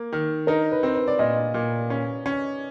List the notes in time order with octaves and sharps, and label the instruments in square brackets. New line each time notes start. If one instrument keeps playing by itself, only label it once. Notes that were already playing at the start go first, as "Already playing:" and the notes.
Already playing: [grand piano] A#3
D#3
[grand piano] D#4 [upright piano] A#4
[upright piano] B4
[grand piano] C4
[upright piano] B4
D5
[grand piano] A#2 [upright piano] D#5
[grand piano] A#2
C#4
C#4